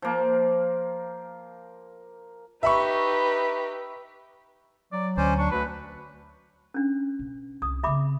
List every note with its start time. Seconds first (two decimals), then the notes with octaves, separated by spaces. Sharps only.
0.02 F3 A#3
2.63 D#4 G4 B4 E5 B5 C#6
4.92 F#3 D5
5.17 D2 C#4 C5 D5
5.38 D4 C#6
5.51 D2 F#3 B4
6.74 C#4 D4
7.19 B2
7.62 C2 D#6
7.83 C#3 C4 E5 B5 D6